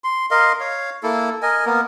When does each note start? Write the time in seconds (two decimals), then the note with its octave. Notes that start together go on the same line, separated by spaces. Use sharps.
0.04 C6
0.31 A#4 D#5 F5 C6
0.60 C#5 F5
1.03 A#3 E4 A4
1.42 A#4 D#5 G#5
1.65 A#3 B3 A#4